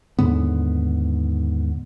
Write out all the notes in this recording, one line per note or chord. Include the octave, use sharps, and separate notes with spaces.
D#2 G#2 D3 B3